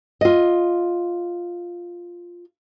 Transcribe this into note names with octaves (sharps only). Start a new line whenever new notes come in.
F4 D#5